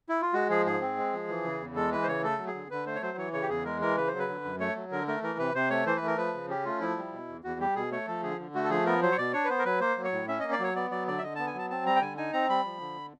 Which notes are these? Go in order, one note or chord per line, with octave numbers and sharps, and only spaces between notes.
E4
F4
G#3 F#4
F3 G#4
G#2 G#4
C4
G#3
F3
E3
C#3
E2
G#3 A4
E3 B4
C5
C#3 C#5
A3 A4
F#3
G#4
D3
D3 B4
A3 C5
C#5
F#3 C5
E3 C#5
C#3 C#5
G4
E2 G#4
G#3 A#4
E3 A#4
C#3 B4
F#3 C5
B4
D3
F#2
A3 C#5
F#3
D3 A#4
A3 A#4
E3 A#4
C3 B4
C3 C5
A3 C#5
E3 C5
B4
A3
A#4
F3 B4
C#3
C#4 G4
A3 F4
F3 E4
G3
B2
E2
E2 F#4
G3 G4
B2 G#4
A3 C#5
F3 A4
D3 G#4
D3
A3 F#4
A4
F3 G#4
B3 A#4
F#3 C5
C#5
B2 D5
D4 C#5
B4
B3 C5
A#4
F#3 B4
A#3 C5
F#3
C#5
A2
C#4 E5
A#3 D#5
D5
F#3 C#5
B3 D5
F#3 D5
D3 D5
E5
D3 D#5
B3 A5
G#5
F#3 A5
C4 A5
G3 A#5
G5
D3 G#5
D#4 G#5
C4 A#5
G3 B5
F3
D3